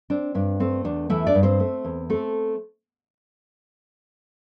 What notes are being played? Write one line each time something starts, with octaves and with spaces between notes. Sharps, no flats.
C4 D4
G2 D4
A3 C4
E2 D4
E3 A3 E4
D4 D5
G2
C4 C5
A3
E2
A3 C4 A4